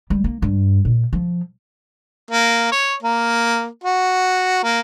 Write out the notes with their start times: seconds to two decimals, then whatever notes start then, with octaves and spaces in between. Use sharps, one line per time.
0.10 G3
0.24 A#3
0.42 G2
0.85 A#2
1.13 F3
2.31 A#3
2.72 C#5
3.03 A#3
3.84 F#4
4.63 A#3